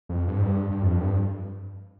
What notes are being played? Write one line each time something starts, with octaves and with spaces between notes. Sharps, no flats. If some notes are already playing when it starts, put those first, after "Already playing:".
F2
G2
G#2
G2
G2
F2
G2